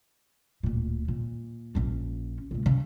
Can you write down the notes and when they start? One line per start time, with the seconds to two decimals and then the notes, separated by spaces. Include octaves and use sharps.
0.63 D1 A#2
1.08 A#2
1.75 A#1 C#4
2.51 C#2 A#2
2.66 C#3